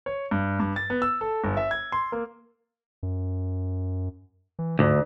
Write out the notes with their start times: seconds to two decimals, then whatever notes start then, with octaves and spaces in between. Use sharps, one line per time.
0.06 C#5
0.31 G2
0.60 G2
0.76 A6
0.90 B3
1.02 E6
1.21 A4
1.44 G1
1.57 E5
1.71 G#6
1.92 C6
2.12 A#3
3.03 F#2
4.59 E3
4.79 D2 G#2